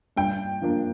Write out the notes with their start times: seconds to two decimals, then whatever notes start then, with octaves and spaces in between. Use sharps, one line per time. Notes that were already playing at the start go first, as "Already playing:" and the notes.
0.17 G2 G5
0.62 F3 A#3 D4